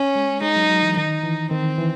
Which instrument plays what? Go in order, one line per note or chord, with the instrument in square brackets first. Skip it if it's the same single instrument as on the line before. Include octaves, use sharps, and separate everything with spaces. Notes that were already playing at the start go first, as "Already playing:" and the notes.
Already playing: [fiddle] C#4
[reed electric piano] G#3
[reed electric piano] G#3 [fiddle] D#4
[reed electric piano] F#3
F#3
E3
[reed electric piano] D#3 [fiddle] D#4
[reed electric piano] E3
[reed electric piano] D#3 [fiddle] C4
[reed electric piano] E3